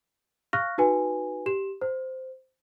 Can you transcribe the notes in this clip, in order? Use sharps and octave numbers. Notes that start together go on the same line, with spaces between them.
F5 C#6 F6 F#6 A#6
D#4 F#4 B4 G#5
G4 E7
C5